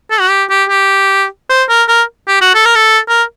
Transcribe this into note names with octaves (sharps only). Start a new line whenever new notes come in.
A4
F#4
G4
G4
G4
C5
A#4
A#4
G4
F#4
A4
A#4
A4
A#4